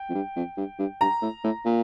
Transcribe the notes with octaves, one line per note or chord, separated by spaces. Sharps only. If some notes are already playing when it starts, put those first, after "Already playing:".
Already playing: G5
F2
G2
F2
G2
G2
G2 A#5
A2
A2
A#2